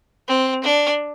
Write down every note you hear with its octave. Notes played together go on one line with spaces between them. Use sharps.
C4
D4